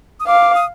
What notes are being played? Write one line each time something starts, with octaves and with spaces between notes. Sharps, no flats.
D#6
F5 D6
D#6